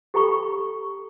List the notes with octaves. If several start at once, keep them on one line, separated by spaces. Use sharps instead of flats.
G4 A4 G5 A#5 B5 C#6